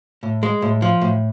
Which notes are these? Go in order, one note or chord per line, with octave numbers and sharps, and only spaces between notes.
A2
G#3
A2
F3
A2